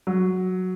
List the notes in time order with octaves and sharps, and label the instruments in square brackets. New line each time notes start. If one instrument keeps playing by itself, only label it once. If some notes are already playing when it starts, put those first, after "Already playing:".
[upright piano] F#3